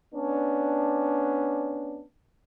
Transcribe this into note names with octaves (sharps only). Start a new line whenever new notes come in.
B3 C#4 D4